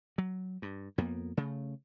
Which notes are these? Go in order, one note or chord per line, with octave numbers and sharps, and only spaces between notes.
F#3
G2
F2 A#3 B3
C#3 A3